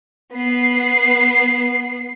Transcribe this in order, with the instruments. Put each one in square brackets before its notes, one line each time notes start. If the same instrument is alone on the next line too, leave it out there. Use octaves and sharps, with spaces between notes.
[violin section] B3 C7